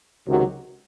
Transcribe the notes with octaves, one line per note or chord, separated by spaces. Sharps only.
C#2 C3 D#3 F#3